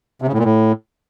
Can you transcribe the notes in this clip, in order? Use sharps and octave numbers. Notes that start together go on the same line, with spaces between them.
C3
C#3
A2
A#2
A2